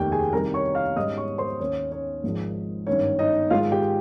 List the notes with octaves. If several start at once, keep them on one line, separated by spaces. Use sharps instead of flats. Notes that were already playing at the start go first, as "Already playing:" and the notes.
Already playing: F1 D#2 D#3 G4 G5
G#4 G#5
C2 C3 D#3 G3 A#4 A#5
C#5 C#6
F5 F6
G#2 G3 C#4 D#5 D#6
C#5 C#6
C5 C6
D#2 D#3 A#3 C#4 C#5
C#4 C#5
G#1 G#2 F3
G#1 G2 D#3 C#4 C#5
D#4 D#5
G#2 D#3 G#3 F4 F5
G4 G5